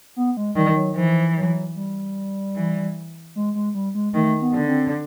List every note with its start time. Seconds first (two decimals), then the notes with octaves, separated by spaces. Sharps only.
0.16 B3
0.37 G#3
0.56 D#3 G3
0.76 F#3
0.96 E3 F3
1.36 F#3
1.76 G3
2.56 E3
3.36 G#3
3.55 G#3
3.75 G3
3.95 G#3
4.14 D#3 A3
4.42 B3
4.54 D3
4.67 C4